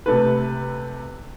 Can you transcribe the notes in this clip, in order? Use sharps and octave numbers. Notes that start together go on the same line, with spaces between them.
C3 A3 B4